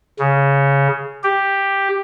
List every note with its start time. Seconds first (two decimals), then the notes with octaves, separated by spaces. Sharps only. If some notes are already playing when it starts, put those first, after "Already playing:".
0.19 C#3
1.24 G4